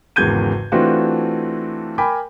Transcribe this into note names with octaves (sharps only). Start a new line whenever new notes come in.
G#1 E2 C#3 G6 G#6 D#7
E3 A3 C4 D4 F4 F#4
A#4 G5 G#5 B5 D6